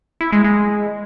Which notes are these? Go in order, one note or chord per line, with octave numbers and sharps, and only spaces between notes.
E4
G#3
G#3